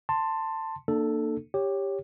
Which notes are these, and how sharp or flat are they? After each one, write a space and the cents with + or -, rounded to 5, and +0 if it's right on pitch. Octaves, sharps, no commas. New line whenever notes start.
A5 +15 C6 +0
A#3 +0 D4 +40 A4 +0
G4 +10 C#5 +0